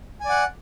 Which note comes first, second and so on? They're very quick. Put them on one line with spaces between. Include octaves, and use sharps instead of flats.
G#5 D5 F#5